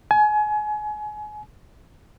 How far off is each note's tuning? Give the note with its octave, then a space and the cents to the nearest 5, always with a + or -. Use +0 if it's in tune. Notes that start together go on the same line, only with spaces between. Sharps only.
G#5 +30